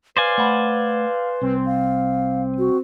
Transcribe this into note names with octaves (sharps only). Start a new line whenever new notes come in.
B4 C5 D5 F5 G#5
A3 F#5 B5
C2 C4
F5
F#4